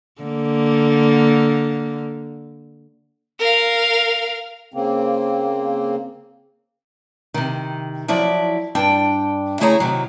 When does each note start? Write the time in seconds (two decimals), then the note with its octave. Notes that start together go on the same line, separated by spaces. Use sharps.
0.22 D3 A#3
3.39 A#4 F5
4.74 C#3 A#3 C4
7.34 C3 D#3
8.08 F3 F#3 E4 D5
8.75 G2 D4 G5
9.60 C#3 A3 E4 G#4 C#5 A#5
9.80 C3 D#3 F#3